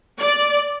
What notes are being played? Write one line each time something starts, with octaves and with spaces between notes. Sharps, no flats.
D5